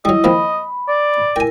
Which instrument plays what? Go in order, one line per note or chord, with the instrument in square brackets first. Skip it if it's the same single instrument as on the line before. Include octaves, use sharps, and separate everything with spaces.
[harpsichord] F#3 G3 [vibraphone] E4 [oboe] D#5
[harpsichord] F3 A#3 C4 [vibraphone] B5
[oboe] D5
[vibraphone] E4 A#4 [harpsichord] G5 G#5